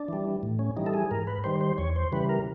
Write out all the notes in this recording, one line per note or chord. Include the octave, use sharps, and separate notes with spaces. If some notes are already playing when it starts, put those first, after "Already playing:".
Already playing: D4
E3 G3
A2
C#4
E3 G3 D#4
A4
G#4
G#2 A#4
B4
D#3 G3 C5
C5
E2 C#5
C5
C#3 E3 G3 B4
A#4